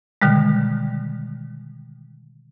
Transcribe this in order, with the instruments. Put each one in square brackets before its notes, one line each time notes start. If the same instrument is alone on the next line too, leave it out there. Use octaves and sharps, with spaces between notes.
[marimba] B2 D3 D#3 G3 G#3